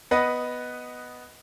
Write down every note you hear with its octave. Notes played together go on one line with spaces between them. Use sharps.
B3 B4 D#5 F#5